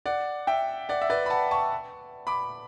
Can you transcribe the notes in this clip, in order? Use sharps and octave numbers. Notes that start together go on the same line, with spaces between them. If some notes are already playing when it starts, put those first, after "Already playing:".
D5 F#5
E5 G5
D5 F#5
E5
B4 D5
B5
F#5 A5
A5 C#6
B5 D6